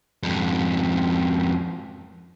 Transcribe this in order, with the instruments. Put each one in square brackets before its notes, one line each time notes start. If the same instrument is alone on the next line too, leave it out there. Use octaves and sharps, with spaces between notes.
[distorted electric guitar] F2 G#2